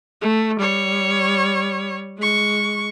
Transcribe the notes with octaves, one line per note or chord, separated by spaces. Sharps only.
A3
G3 C#5
G#3 C#6